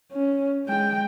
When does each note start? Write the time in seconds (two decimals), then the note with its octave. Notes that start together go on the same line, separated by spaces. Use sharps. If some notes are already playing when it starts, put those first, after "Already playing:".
0.12 C#4
0.66 G#3 G5